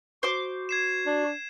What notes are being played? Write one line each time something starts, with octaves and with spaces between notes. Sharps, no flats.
F#4 C5 D6
G#6 C7 E7
D4